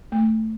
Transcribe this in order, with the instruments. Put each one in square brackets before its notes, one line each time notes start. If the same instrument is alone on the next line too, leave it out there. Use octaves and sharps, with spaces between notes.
[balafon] A3